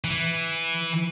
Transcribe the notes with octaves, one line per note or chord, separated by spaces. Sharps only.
E3